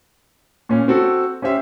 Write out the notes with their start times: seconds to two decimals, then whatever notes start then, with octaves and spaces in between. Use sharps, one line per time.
0.69 A#2 C#4
0.88 C4 F#4 A4
1.42 C#4 G4 C5 E5